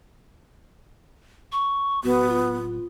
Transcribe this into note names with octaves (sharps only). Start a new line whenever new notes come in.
C#6
D1 B3 F#4
F4